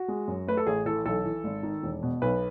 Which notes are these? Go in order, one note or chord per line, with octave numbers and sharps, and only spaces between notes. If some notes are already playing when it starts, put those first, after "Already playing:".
Already playing: F#4
G#3
F#2
A3 B4
A4
A1 G#4
E3 A4
B1 A4
E3
G#1
D#3
E1
B2
B1 B4